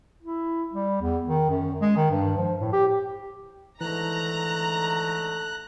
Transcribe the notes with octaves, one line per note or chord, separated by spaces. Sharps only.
E4
G3
E2
D#3
F#2
G#3
D#3
G2
F3
A2
G4
G#2 D3 E3 A3 A#5 F#6